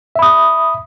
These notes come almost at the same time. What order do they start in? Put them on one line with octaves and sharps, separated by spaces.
E5 B5 D#6